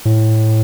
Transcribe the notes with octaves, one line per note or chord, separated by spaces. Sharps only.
A2